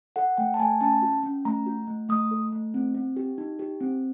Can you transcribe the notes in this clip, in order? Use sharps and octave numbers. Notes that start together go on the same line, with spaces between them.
A4 F#5
A3 G5
A5
A3 G#5
C#4 A5
F#4
C#4
A3 A#5
F#4
A3
A3 D#6
A4
A3
C4
C4
G4
D#4
G4
C4